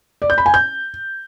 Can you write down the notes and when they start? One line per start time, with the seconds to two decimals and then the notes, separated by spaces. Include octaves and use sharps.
0.22 D5
0.30 G6
0.38 B5
0.46 G#5
0.54 G6